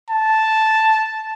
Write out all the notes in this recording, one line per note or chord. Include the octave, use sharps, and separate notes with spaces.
A5